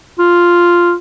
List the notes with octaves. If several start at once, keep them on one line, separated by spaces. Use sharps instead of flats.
F4